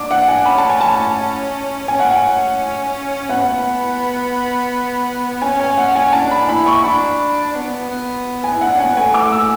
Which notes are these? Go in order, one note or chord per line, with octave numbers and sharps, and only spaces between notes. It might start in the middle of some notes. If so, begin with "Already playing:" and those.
Already playing: D4 D6
F#5
G#5
C#4 B5
A5
G#5
A5
C#4 G#5
F#5
G#5
B3 F#5
C#4 G#5
G#5
F#5
G#5
D4 A5
B5
E4 B5
C#6
D4 B5
B3
B3
G#5
E4
D4 F#5
C#4 G#5
B3
A3 G#5
D6
E6